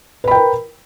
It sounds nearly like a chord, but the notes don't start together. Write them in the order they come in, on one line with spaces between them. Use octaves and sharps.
B4 B5 G5 A#4